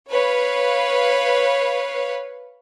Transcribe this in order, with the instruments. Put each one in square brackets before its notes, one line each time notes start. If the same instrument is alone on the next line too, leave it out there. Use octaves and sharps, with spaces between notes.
[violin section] B4 C#5 F5